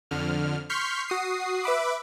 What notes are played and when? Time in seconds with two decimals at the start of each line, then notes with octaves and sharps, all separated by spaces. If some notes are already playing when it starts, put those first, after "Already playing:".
0.11 F2 D3 F6
0.69 C6 C#6 F6 G6 B6 C7
1.08 F#4 D#6 C7
1.64 B4 E5 B5 D6